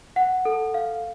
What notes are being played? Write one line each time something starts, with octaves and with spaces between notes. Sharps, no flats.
F#5
A4
F5